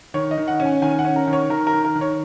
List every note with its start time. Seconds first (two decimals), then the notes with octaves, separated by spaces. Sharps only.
0.14 D#3 C#5
0.31 D#5
0.37 D#3
0.48 F#5
0.60 C#4
0.65 G#5
0.82 D#3 G#5
0.99 F#5
1.05 C#4
1.16 A#4
1.27 D#3
1.33 C#5
1.50 D#3 A#4
1.67 A#4
1.73 D#3
1.85 A#4
1.95 D#3
2.01 C#5